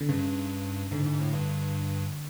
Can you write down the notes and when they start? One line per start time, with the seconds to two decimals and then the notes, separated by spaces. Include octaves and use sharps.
0.01 D3
0.09 G2 C#3
0.91 G#2 D3
1.06 G#2
1.20 A2
1.33 G2